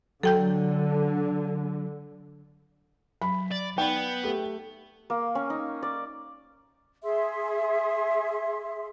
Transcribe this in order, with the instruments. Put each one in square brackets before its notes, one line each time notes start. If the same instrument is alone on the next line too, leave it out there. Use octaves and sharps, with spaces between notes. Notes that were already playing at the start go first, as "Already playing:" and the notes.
[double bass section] D3 [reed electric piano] F#3 [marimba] A4 G5 G6
[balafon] F#3 [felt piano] B5
[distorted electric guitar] D5
[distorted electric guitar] B3 [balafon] D#4 D5 B5 [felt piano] G5
[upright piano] A3 G4
[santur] A#3
C#4
D#4
D5
[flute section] G#4 E5 C6